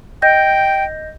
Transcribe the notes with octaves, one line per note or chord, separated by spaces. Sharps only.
D#5 G5 G6 A#6